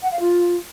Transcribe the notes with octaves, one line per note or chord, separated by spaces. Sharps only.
F#5
F5
F4